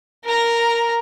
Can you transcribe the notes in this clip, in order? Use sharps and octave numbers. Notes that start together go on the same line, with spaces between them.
A#4 A#5